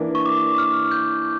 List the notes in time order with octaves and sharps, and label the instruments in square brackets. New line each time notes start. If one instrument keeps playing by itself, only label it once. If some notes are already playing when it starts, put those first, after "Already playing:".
Already playing: [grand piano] E3 A#3 D4
[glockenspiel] C#6
D6
F6
G6